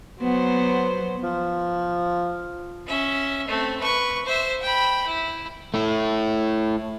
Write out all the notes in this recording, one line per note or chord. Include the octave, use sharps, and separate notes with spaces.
F#3 B3 C5
F3
C#4 E5
A3 C4
B4 C#6
C5 E5
G5 B5
E4
A3 E4